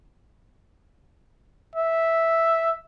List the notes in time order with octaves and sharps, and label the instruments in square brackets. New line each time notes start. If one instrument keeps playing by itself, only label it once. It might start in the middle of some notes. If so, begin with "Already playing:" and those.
[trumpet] E5